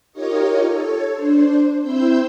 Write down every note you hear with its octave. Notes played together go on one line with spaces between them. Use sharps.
D#4 F4 G4 A#4 C#5 D#5
A4 C#5
D4 C5
C4 E4 C5 E6 G6